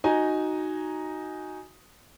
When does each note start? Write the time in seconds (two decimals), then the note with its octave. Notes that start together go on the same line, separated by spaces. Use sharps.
0.04 D#4 F#4 G#5 A#5